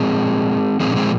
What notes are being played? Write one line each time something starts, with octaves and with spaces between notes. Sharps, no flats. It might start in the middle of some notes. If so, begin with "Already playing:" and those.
Already playing: A#2 F3 G#3 C4
A#2 F3 G#3 C4
D4
G#3 C4